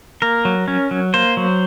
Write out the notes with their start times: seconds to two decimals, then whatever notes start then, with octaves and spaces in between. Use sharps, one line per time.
0.22 A#3 A#4
0.45 F#3
0.68 C#4
0.91 F#3
1.14 A#3 C5
1.37 F#3